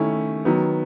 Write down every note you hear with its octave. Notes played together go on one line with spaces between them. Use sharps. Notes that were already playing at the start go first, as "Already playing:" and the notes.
Already playing: D#3 A3 C#4 E4
D#3 F#3 B3